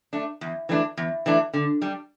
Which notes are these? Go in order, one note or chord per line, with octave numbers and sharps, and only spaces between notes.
A3 D4
E2
E3 A3 D4
E2
E3 A3 D4
D3
G3 D4